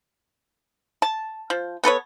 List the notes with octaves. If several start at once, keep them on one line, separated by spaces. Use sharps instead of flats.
A5
F3
B3 A4 B4 C#5